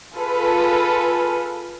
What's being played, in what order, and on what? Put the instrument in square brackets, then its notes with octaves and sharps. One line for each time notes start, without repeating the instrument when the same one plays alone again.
[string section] F4 G#4 A4 B4